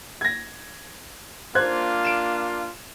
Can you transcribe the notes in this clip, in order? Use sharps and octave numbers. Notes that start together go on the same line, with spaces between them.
G#6 A#6
A#3 D4 F4 C5 F#6 G#6
D7 E7